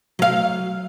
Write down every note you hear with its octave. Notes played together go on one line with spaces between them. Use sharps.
F#3 F5